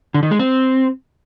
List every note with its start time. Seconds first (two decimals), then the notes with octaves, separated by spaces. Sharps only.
0.14 D3
0.23 D#3
0.31 G#3
0.39 C4